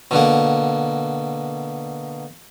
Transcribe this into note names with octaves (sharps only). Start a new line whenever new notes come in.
B2 D3 A#3